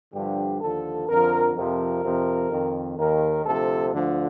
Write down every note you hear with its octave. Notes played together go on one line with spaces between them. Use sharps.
G2 D3 F3 G4
D#2 D3 F3 A4
F2 D3 F3 A#4
F2 C3 F3 A#4
F2 C3 F3
F2 D#3
D#2 D#3 A#4
D2 C3 F3 A4
D2 D3 F3